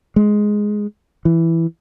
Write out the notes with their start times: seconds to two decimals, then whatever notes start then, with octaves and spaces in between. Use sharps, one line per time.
0.16 G#3
1.25 E3